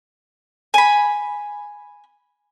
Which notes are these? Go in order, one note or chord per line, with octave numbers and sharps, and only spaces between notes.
G#5 B5